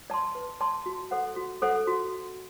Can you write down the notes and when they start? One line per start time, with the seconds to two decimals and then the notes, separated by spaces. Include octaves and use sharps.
0.10 D5 A5 C6
0.35 B4
0.61 D5 A5 C6
0.86 F#4
1.11 A4 C5 F#5
1.36 F#4
1.62 A4 C5 F#5
1.87 F#4